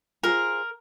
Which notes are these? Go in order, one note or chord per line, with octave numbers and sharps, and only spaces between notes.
F4 G#4 A#4 C5